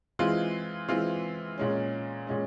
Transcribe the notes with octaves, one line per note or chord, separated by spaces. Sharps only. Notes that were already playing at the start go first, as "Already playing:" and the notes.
E3 G#3 C4 F4
E3 G#3 C4 F4
A#2 G#3 C#4
A#2 G#3 C#4